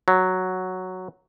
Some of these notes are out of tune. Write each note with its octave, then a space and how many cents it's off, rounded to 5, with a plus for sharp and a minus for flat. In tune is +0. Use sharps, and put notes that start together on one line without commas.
F#3 +0